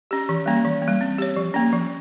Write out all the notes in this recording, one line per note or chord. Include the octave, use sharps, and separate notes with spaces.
C#4 G4
E3
G3 A#3 C#4
E3
A#3
G3
C4
G4 C#5
F3
A#3 C#4
F3